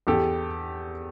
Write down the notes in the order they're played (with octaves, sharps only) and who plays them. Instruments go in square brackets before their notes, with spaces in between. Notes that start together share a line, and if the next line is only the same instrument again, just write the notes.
[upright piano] E2 G4 A4